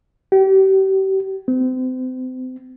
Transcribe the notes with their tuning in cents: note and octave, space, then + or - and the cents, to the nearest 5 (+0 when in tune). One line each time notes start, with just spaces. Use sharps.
G4 -35
C4 -35